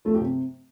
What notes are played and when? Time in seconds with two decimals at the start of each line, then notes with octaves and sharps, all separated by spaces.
0.05 F3 A3
0.15 G4
0.21 C3